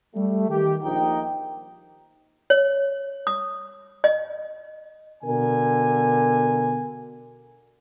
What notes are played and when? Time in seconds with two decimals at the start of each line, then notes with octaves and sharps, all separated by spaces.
0.15 G3 A3
0.49 D#3 G4
0.83 A#1 D#4 G5
2.50 C#5
3.27 D#6
4.04 D#5
5.23 B2 D3 A#4 G#5